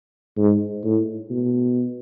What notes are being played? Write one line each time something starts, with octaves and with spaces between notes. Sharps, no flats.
G#2
A2
B2